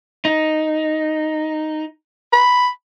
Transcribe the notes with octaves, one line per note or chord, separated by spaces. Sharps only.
D#4
B5